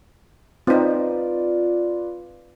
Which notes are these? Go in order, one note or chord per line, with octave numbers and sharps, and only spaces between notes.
C4 D#4 F4 B4 D5